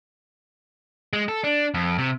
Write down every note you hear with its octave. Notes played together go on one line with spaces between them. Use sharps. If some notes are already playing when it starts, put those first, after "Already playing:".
G#3
A4
D4
F2
C3